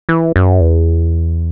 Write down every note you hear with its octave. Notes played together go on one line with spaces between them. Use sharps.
E3
F#2
E2